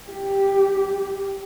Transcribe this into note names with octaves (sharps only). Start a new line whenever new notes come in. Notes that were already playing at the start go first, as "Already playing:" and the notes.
G4